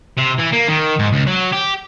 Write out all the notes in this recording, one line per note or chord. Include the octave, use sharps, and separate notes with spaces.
C3
E3
A#3
D#3
G#2
C#2
F#3
G4